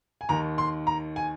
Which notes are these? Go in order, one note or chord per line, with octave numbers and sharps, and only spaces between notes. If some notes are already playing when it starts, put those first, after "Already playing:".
G#5
D#2 D#3 A#5
C6
A#5
G#5